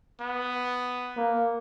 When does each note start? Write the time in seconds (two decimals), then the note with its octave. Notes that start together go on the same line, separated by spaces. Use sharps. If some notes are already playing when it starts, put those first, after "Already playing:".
0.21 B3
1.16 A#3